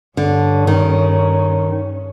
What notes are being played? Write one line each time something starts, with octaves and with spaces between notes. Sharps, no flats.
G2 D3 C#4
D#3